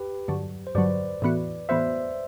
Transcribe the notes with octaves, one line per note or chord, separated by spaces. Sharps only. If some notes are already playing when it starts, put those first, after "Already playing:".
Already playing: G4 B4
G2 D3 F#3
C5
G2 D3 F#3 B4 D5
A2 E3 B3 F#4
A2 E3 B3 F#4 C5 E5